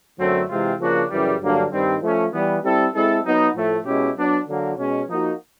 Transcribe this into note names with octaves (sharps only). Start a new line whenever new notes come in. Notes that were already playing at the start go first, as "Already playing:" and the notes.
F#2 D3 F#3 A3 C4
C3 E3 G#3 C4 F4
C#3 F3 A#3 D4 F#4
F#2 C#3 E3 G3
G2 D3 F#3 A#3 D4
G2 D#3 G3 C4
F3 A3 C#4
E3 G3 B3
G3 C4 E4 A4
G#3 C4 E4 A4
F#3 B3 D#4
A2 F3 A3
B2 G#3 C#4 E4 G4
F#3 B3 D4
D3 F#3 A#3
B2 G#3 C#4
F3 A#3 D#4 F#4